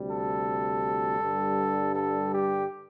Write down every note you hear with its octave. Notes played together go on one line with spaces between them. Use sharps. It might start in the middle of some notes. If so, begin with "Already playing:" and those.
Already playing: D2 C3 G3
A4
G2 D3 G3
A4
G4